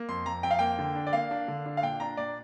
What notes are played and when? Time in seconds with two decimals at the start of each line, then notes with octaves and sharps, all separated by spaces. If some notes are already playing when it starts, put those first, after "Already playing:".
Already playing: A#3
0.09 F2 C6
0.26 F2 A#5
0.43 F2 G5
0.51 F5
0.59 A#3 G5
0.79 D3
0.95 D4
1.07 D5
1.13 A#3 F5
1.31 D4
1.48 D3
1.66 D4
1.77 F5
1.82 A#2 G5
2.00 D4 A#5
2.17 A#2 D5